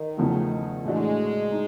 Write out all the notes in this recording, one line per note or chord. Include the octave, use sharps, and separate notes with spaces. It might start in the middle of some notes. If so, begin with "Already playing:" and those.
Already playing: D#3
E2 C#3 F3 A3
A2 E3 G#3 A3 D4 F#4
D#4